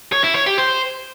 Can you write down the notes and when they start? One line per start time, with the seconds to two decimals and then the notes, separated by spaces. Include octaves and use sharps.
0.12 C#5
0.24 E4
0.35 C#5
0.46 G4
0.58 C5